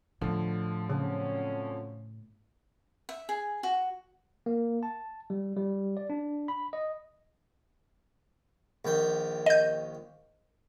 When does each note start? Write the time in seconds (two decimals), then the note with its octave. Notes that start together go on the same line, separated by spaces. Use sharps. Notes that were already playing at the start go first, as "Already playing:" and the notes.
0.21 A2 D3 F3
0.90 C#3 F#3 C4 C#4
3.09 E5
3.29 G#4
3.63 F#4
4.46 A#3
4.83 A5
5.30 G3
5.57 G3
5.97 D5
6.10 D4
6.48 B5
6.73 D#5
8.85 A#1 D#2 G5
9.46 D#5 G6